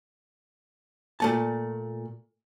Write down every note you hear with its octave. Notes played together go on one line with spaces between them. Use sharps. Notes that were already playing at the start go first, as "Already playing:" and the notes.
A#2 A3 A5